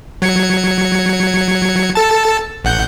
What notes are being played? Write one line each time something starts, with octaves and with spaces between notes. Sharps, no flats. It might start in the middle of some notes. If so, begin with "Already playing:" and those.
F#3 G#6 C#7
A4 A5
A1 F#5 G6